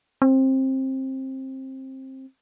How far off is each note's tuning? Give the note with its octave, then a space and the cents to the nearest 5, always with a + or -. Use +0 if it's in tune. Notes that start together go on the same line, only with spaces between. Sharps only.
C4 +20